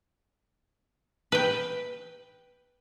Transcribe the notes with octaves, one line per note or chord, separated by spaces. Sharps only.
B4 G5